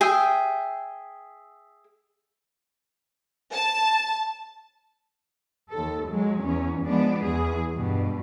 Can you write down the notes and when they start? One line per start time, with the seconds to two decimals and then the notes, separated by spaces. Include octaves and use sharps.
0.01 G#4 E5 G5
3.53 A5
5.71 D#2 A4
6.11 F#3 G#3
6.44 E2 C#4
6.84 F3 G#3 B3 D4
7.25 E2 E3 G#4
7.74 G2 B2